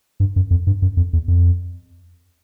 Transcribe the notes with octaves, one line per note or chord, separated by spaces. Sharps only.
G2
F#2
F2
G2
F#2
F2
E2
F2